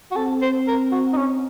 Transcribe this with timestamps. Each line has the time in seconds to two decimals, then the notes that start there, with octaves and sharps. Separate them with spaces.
0.11 F#4
0.16 C4 A4
0.42 C5
0.67 A#4
0.91 F#4
1.13 D#4
1.17 C#4